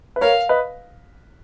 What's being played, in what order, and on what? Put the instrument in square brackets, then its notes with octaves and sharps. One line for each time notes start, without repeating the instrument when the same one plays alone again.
[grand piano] B4
[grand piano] A#4 C#5 [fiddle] F5
[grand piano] B4 D#5